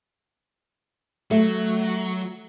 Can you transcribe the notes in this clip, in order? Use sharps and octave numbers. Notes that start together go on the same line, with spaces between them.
F#3 A3